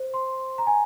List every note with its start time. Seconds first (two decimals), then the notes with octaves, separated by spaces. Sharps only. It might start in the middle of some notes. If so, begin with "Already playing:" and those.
Already playing: C5
0.14 C6
0.58 A#5
0.67 G#5